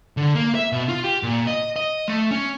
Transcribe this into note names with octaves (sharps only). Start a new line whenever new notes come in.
D3
A#3
E5
B2
F4
G4
A#2
D#5
D#5
A3
C#4